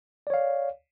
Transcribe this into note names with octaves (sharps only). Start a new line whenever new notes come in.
C#5 D5 F5